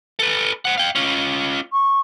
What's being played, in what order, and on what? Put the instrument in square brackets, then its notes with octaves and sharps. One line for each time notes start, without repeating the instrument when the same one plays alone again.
[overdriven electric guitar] A4 B4
C5 F#5
F5 G5
C#4 F4
[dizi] C#6